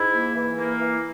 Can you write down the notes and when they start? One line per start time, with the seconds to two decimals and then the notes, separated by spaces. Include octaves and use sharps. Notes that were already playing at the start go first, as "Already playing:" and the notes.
Already playing: G#2 E4
0.13 A#3
0.35 E3
0.58 A#3
0.80 E3